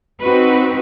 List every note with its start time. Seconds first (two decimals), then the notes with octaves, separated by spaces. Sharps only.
0.22 C4 D#4 F#4 B4